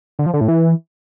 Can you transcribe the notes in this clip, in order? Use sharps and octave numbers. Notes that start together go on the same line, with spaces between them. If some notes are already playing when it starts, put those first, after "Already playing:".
D3
F3
D3
A2
E3